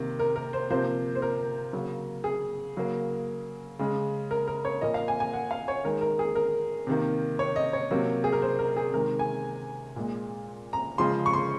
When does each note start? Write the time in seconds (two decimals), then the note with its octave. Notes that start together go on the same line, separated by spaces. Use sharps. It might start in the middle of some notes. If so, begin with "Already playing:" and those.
Already playing: C3 D#3 A#3
0.19 A#4
0.36 A#4
0.53 C5
0.70 C3 F3 A#3 C5
1.15 C5
1.22 A#4
1.73 C#3 F#3 A#3
2.24 G#4
2.77 C#3 F#3 A#3
3.79 C#3 G#3
4.31 A#4
4.48 A#4
4.65 C#5
4.81 A#2 F3 A#3 D#5
4.94 F5
5.08 G#5
5.20 G#5
5.33 F#5
5.51 F5
5.68 C#5
5.84 D#3 G#3 A#4
6.01 A#4
6.19 G#4
6.35 A#4
6.87 C3 D#3 A#3
7.39 C#5
7.56 D#5
7.73 C#5
7.91 C3 F#3 A#3
8.24 G#4
8.33 A#4
8.42 C5
8.59 A#4
8.77 G#4
8.93 C3 D#3 G#3 A#4
9.19 G#5
9.96 A#2 G#3
10.73 A#5
10.98 C#3 F3 G#3 C6
11.26 C#6
11.33 C6